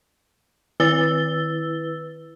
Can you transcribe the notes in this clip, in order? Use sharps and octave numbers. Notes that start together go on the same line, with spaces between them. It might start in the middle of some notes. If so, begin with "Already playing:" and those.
D#3 E4 B4 E6 A6 G7